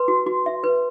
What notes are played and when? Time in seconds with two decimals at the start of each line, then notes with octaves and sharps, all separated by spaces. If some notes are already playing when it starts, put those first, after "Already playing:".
Already playing: B4 C6
0.08 F#4
0.27 F#4
0.46 E5
0.64 B4